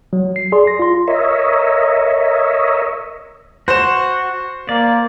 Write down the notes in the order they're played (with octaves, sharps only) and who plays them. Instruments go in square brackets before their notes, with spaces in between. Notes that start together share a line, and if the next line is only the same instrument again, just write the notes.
[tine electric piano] F#3
C7
G#4 D5 C6
A#6
F4 C6
[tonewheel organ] A#4 C#5 D#5 E5
[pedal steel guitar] F#4 [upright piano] C5 E7
[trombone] A#3 [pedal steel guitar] D5